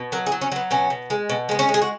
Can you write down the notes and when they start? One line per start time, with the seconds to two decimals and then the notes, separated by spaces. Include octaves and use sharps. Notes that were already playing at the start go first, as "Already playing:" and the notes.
Already playing: B2
0.12 F#3 A#4
0.26 G#4
0.32 F#3
0.41 C#4
0.52 F#3 B3
0.71 B2 C#4
0.90 B2
1.10 G#3
1.29 B2
1.49 G#3 B3
1.59 C#4
1.69 G#3
1.74 G#4
1.82 F#4